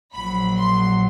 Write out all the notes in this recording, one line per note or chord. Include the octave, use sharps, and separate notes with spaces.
A#1 A#2 F#3 B5
C6